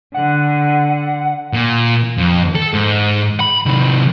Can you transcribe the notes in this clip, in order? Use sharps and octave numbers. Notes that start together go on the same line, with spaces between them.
D3 F#5
A#2
F2
A4
G#2
B5
C3 D#3